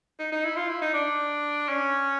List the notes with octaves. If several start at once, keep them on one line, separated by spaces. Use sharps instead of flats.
D#4
D#4
E4
F4
E4
D#4
D4
C#4